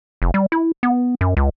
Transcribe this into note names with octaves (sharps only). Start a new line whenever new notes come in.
F1
G3
E4
B3
F#2
C#2